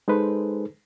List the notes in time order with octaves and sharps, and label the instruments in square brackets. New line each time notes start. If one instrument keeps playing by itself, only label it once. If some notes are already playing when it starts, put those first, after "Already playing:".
[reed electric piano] G#3 D#4 G#4 A4 B4 C5